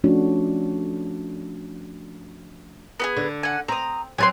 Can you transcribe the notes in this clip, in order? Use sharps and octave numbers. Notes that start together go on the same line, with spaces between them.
F3 A3 C#4 D4 F#4 C#5
B3 G4 G#4
D3
F#5 G#5
C4 A#5 D#6
F#3 C4 G#5 A5 C6